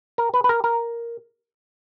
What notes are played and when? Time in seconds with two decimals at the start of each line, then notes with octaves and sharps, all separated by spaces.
0.18 A#4
0.34 B4
0.44 B4
0.49 A#4
0.64 A#4